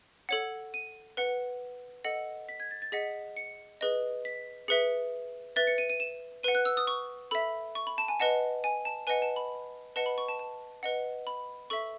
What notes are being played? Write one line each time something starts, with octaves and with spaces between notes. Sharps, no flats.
A4 C#5 F#5
D#7
B4 F#5
A4 D#5 F#5
B6
G#6
A6
A6
G#4 D#5 F#5 B6
C#7
G#4 B4 D#5
B6
G#4 B4 E5 C#7
B4 E5 A6
C#7
D#7
D#7
E7
B4 F#5 D#7
F#6
E6
D#6
C#6
A4 E5 B5
C#6
B5
A5
G#5
B4 D#5 F#5 A5
G#5
A5
B4 D#5 F#5 G#5
A5
B5
B4 D#5 F#5 A5
B5
C#6
A5
A5
B4 D#5 F#5
B5
A4 E5 C#6